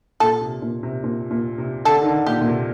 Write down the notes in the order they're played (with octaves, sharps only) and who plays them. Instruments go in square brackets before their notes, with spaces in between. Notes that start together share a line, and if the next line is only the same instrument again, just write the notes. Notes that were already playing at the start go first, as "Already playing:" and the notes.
[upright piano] A#2 [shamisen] A4
[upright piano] C3
A#2
C3
A#2
A#2
C3
[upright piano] D3 [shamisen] A4
[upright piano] D#3
D3
[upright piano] A#2 [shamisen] G4
[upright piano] A#2
C3